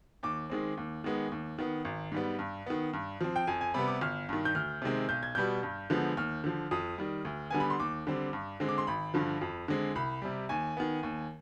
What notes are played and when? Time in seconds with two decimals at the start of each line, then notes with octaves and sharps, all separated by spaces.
0.23 D#2 D6
0.50 D#3 G#3 C4
0.77 D#2
1.04 D#3 G#3 B3
1.32 D#2
1.59 D#3 B3
1.85 G#1
2.12 G#2 G3 B3
2.39 G2
2.66 D#3 B3
2.93 G2
3.21 F3 C4
3.36 G5
3.47 F2 G#5
3.61 G#5
3.74 C3 G3 B3 B5
3.88 D6
4.01 G1 F6
4.29 G2 D#3
4.45 G6
4.55 D2 F6
4.82 C3 D#3 G#3 C4
5.09 B1 G6
5.23 G#6
5.35 B2 G3 B3 G6
5.63 G2
5.90 D3 F3 G#3 B3
6.17 D#2 F6
6.44 D3 F3
6.71 F2 D#6
6.98 D#3 G3
7.25 D2
7.51 D3 G3 B3 G#5
7.60 B5
7.70 C6
7.80 D#2 D6
8.07 D3 G3 C4
8.33 G2
8.60 D3 G#3 C4
8.69 D6
8.78 C6
8.87 G#1 B5
9.14 G2 D3 F3
9.41 F2
9.68 D3 G#3 C4
9.95 C2 B5
10.22 C3 G3
10.49 D#2 G#5
10.77 D#3 B3
11.03 D#2